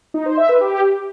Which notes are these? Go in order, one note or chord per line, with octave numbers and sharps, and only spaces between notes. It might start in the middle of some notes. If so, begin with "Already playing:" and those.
D#4
C5
E5
B4
G4